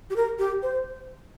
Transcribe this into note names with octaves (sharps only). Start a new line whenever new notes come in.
G4
A#4
G4
C5